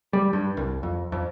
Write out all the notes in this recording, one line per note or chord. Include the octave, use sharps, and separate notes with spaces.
G3
G2
C2
F2
F2